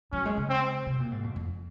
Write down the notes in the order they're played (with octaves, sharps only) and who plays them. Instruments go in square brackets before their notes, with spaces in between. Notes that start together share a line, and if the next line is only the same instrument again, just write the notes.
[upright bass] F#3 [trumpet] C#4
[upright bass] G#3
C#3
[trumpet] C4
[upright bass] C3
A#2
G#2
F2
F2